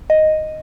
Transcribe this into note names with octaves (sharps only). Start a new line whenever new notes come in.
D#5